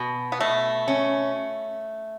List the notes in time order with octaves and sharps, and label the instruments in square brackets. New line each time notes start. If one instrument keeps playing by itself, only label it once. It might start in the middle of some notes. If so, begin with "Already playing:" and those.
Already playing: [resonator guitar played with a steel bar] B2
[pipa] B3
[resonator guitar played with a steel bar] B2 [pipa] A3
[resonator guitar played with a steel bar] C#4